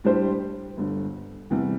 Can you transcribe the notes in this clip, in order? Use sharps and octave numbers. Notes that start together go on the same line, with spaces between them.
A2 G3 D4 G4 C5
G1 G2 D3
E2 C3 G3